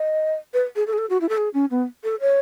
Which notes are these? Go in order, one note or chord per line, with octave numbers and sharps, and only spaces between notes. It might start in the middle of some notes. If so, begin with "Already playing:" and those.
Already playing: D#5
B4
G#4
A4
G#4
A4
F#4
E4
A4
G#4
C#4
B3
A4
C#5